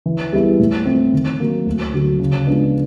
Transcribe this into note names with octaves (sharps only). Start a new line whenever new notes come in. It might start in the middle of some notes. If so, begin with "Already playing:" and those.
E3
G3 B3 E4 G#4
A2
F3 A3 C4
D#3
F#3 A#3
D2
D3 F#3
C#3
F3 G#3 B3 D4